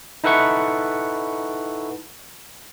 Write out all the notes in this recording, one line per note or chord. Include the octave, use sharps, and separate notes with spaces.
D#4 E4 A4 B4 F#5 C#6